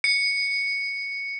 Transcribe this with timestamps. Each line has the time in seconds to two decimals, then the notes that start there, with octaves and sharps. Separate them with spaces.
0.04 C#7